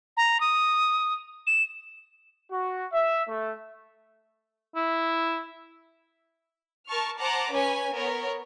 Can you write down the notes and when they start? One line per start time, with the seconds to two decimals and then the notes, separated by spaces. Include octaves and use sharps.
0.17 A#5
0.40 D#6
1.47 E7
2.51 F#4
2.93 E5
3.28 A3
4.75 E4
6.87 A#4 A5 C#6 F6
7.20 C5 F#5 A5 A#5 D6
7.52 C#4 B4 C#5 G#5
7.93 B3 A#4 C#5